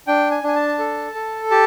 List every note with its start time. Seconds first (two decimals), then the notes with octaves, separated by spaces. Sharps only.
0.07 D4 G5
0.31 G#5
0.43 D4 G#5
0.55 A5
0.79 A4
1.15 A4
1.51 G4 A5